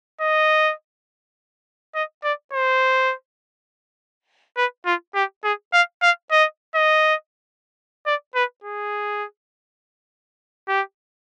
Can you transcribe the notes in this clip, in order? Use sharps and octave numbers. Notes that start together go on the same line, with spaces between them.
D#5
D#5
D5
C5
B4
F4
G4
G#4
F5
F5
D#5
D#5
D5
B4
G#4
G4